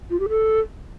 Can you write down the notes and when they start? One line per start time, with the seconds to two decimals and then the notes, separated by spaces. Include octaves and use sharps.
0.10 F4
0.20 G4
0.29 A4